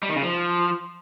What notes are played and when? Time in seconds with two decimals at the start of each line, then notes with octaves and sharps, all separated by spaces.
0.03 G3
0.09 D#3
0.16 C#3
0.23 F3